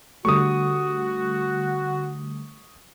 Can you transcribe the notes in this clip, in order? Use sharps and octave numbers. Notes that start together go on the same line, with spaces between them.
D3 G3 A3 F#4 C#6 D#6